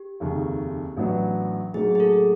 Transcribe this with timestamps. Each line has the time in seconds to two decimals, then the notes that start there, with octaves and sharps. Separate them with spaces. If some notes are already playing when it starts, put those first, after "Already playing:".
Already playing: G4
0.20 F1 D#2 C#3
0.97 A1 A2 F#3 B3 D4
1.74 B1 A2 F#3 A#3 D4 G#4
1.95 G#4
2.00 A4